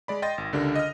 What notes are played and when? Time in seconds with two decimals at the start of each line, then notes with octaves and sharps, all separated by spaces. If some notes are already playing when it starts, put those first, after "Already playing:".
0.08 G#3 D5 B5
0.22 D#5 G5 C6 A6 A#6
0.38 G#1
0.53 C#2 D3 D4 G4 A#4 A#6
0.75 D#5 F6